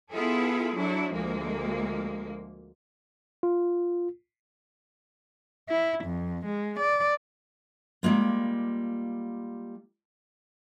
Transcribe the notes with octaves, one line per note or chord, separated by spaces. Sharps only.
B3 E4 F4 G#4 A4
F#3 D4 E4
D2 F3 G#3 A#3
F4
E4
F2
G#3
D5
G3 G#3 A#3 F4